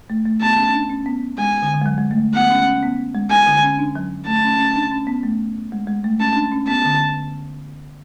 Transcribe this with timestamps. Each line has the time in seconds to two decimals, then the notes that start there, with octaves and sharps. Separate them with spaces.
0.10 A3
0.25 A3
0.41 B3 A5
0.58 C#4
0.74 D4
0.90 C#4
1.06 B3
1.38 G#3 G#5
1.62 D3
1.74 D3
1.81 G#3
1.86 F#3
1.98 G#3
2.11 A3
2.34 B3 F#5
2.51 C#4
2.66 C#4
2.83 B3
3.15 G#3
3.30 G#5
3.47 D3
3.63 C#4
3.79 D4
3.95 F#3
4.27 A3 A5
4.44 C#4
4.59 C#4
4.76 D4
4.92 C#4
5.07 B3
5.23 A3
5.72 G#3
5.87 G#3
6.04 A3
6.20 C#4 A5
6.35 D4
6.52 C#4
6.68 B3 A5
6.85 D3